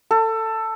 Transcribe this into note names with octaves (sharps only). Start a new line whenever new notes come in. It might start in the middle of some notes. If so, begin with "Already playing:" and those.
A4